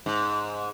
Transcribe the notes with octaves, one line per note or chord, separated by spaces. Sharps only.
G#2